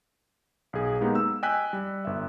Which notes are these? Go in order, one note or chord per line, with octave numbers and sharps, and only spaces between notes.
B1 G#4
G#3 A#3 B3 D#4 G4
E6
D#5 G5 G#5 E6 F#6 B6
G3
G1 E5